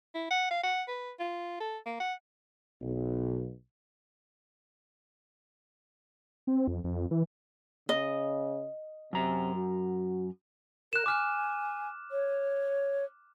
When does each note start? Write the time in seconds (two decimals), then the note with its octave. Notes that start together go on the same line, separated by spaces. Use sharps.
0.15 E4
0.31 F#5
0.51 F5
0.64 F#5
0.88 B4
1.20 F4
1.60 A4
1.86 A#3
2.00 F#5
2.82 B1
6.47 C4
6.68 F2
6.84 F2
7.11 E3
7.89 C#3 D#5
9.13 F#2 C3 A#5
9.55 F#4
10.93 A#4 F#6 E7
11.06 G#5 D6 F6 F#6
12.11 C#5